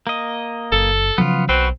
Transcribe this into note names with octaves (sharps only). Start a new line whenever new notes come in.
A#3 D#5
F#1 A4
C#3 F3 F#3 B3 F4
B1 C4 F#4 B4